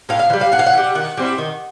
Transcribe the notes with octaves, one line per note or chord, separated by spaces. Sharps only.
A2 F5
F5
E3
G3
F5
A2 F#5
F5
F#5
E3
G3
D#3 F#5
G3 C4 E4
D#3